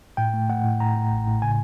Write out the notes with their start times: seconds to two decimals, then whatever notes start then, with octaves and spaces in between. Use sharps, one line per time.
0.17 A2 G5
0.34 A3
0.49 A3 F#5
0.64 A2
0.80 A2 A#5
0.96 A2
1.12 A1
1.27 A2
1.42 C#3 G#5